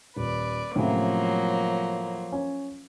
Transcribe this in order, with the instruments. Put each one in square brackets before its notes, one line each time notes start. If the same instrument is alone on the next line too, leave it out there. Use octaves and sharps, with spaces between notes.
[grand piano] D#1 [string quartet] B4 D5
[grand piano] A2 C3 C#4 [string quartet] F3 F#3 A#3
[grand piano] C#4